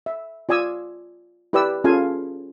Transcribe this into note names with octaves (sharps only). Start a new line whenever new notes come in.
E5
F4 D5 G#5 D#6 E6
E4 G4 B4 D5 G5 E6
C#4 F4 G#4 A4 F5 G#5